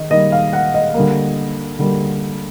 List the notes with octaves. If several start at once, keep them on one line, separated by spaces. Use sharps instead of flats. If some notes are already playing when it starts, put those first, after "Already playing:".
Already playing: D#3 D#5
D#3 G3 A#3 D#5
F5
F#5
D#5
D3 G3 A#3
D3 G3 A#3